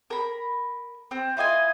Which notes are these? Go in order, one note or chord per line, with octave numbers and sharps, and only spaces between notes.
A#4 B5
C4
E4 F4 D#5 G#5